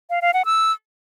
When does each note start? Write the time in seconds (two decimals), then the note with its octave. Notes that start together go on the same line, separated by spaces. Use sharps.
0.10 F5
0.22 F5
0.34 F#5
0.45 E6